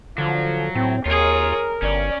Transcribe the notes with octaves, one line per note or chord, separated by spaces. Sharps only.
D3 F3 F#3
A2 C4
D#2 F4 G#4 A#4 C#5
G1 C#4 D5